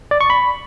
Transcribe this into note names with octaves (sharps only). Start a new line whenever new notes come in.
D5
C#6
B5